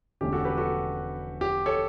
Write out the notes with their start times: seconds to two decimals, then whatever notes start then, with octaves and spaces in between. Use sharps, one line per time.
0.21 E1 E2 D3 A3 C#4 G4
0.33 F#4 A4
0.45 G4 B4
0.57 F#4 A4
1.41 G4
1.66 A4 C#5